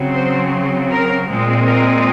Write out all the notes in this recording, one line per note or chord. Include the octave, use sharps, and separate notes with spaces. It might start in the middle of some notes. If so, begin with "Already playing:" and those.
Already playing: C#3 F#3 C4
C5
A#4
A#2 G#3 C4
A#4